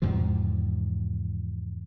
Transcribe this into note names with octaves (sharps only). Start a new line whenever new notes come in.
E2 G#2 C3 F3